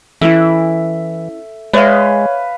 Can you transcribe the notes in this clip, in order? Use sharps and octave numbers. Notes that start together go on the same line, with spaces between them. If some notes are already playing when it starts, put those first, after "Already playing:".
E3 C#4 E4 A4 E5
G#3 B4 C#5 D5 E5 F5